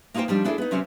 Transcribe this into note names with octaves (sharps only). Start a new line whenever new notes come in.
A#3 D#4 F4 G#4 C5 G5
F3 G3 D4 D#4
B3 D4 E4 G#4 A4
B3 D#4
C3 F#3 C4 C#4